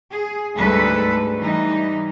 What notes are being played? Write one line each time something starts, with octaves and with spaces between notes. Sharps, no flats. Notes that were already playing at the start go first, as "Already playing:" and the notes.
G#4
D2 G#2 G3 A3 A4 B4
E3 G3 D#4